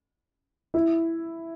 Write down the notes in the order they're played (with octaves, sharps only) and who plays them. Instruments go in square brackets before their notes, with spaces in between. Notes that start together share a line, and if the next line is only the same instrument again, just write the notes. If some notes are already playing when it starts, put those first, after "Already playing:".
[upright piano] E4